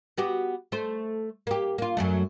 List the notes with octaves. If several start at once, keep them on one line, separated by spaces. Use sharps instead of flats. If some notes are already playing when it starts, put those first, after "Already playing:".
B3 F#4 G4
A3 C5
A#3 G4
A#3 F4
F#2 F#3 A3